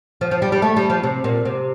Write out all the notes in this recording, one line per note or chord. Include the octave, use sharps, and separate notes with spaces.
F3
F3
G3
G3
A3
G3
F3
C3
A#2
C3